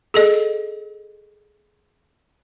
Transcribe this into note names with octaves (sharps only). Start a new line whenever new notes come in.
G#4 A4 D#5